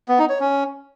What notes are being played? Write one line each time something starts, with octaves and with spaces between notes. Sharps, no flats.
B3
D#4
C#5
C#4